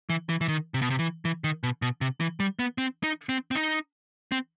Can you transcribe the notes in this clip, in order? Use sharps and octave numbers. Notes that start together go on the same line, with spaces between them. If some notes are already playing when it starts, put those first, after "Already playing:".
E3
E3
E3
D#3
C3
B2
C3
E3
E3
D#3
B2
B2
C3
E3
G3
B3
C4
D#4
C4
C4
D#4
C4